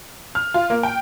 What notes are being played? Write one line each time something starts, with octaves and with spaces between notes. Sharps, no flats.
F6
F4
A#3
G5